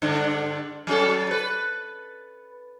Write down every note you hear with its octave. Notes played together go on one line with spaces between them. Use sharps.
G2 D3 D4
F#3 C#4 A4
B4